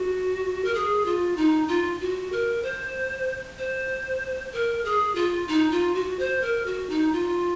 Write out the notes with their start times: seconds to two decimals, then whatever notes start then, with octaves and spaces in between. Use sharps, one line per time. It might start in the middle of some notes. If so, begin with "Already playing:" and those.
Already playing: F#4
0.65 A#4
0.75 G#4
1.06 F4
1.37 D#4
1.68 F4
2.01 F#4
2.32 A#4
2.63 C5
3.58 C5
4.53 A#4
4.85 G#4
5.15 F4
5.48 D#4
5.71 F4
5.95 F#4
6.19 C5
6.42 A#4
6.66 F#4
6.90 D#4
7.13 F4